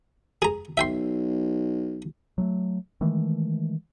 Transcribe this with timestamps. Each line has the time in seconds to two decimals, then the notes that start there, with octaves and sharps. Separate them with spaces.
0.42 G#4 A#5
0.77 B1 E5 G5 C6
2.38 F#3 G#3 A3
3.01 D#3 E3 G#3 A3